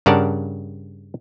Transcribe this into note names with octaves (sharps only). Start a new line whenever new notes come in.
G2 C#3 A#4 D5 F#5 A5